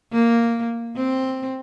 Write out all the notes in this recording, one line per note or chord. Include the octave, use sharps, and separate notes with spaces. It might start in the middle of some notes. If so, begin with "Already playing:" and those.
A#3
C4